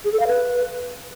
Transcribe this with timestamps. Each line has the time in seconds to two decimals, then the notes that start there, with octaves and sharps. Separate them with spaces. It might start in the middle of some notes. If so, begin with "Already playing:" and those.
0.05 G#4
0.12 A4
0.20 F5
0.27 B4